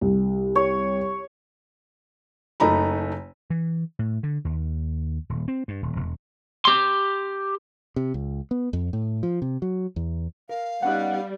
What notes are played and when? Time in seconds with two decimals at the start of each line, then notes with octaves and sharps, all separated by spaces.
0.01 C2
0.55 C#5
2.60 F#1 A3 D#4 A#5 B5
3.50 E3
3.99 A2
4.23 D3
4.45 D#2
5.30 D#1
5.48 C4
5.68 G2
5.83 D#1
5.96 E1
6.65 G4 C6
7.96 C3
8.14 C#2
8.51 B3
8.73 F2
8.93 A2
9.23 F3
9.42 C3
9.62 F#3
9.96 E2
10.49 A#4 F5
10.82 G3 B3 C#4 D#4 F#5